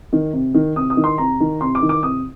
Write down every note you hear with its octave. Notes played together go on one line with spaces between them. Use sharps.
D#3
C3
D#3
C3 D#6
D#6
D#3
C6
C3 A#5
D#3
C3 C6
D6
D#3
D6
C3 D#6